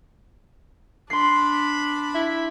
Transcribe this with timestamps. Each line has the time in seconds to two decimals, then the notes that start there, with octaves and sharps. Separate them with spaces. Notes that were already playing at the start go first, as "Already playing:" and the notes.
1.10 D4 B5 C6 C7
2.15 E4